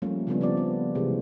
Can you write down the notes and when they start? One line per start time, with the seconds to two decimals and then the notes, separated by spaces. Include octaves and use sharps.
0.02 F3 G3 A3 A#3 C#4
0.27 C#3 F3 G3 A3 B3 D4
0.41 F3 C4 D5
0.57 B3
0.95 C3 E3 G#3 G4